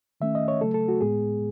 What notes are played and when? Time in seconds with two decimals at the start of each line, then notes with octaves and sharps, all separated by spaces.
0.21 D#3 A3 C#4 E5
0.35 D#5
0.48 C#5
0.61 C#3 F#3 A3 A4
0.74 A4
0.88 F#4
1.01 A2 G#3 B3 G#4